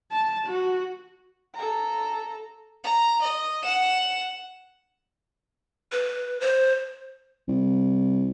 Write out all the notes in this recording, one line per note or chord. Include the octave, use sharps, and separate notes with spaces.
A5
F#4
A4 A#5
A#5
D#5
F#5 E7
B4
C5
C2